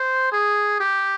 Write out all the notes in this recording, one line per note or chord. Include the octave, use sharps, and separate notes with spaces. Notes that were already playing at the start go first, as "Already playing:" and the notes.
Already playing: C5
G#4
G4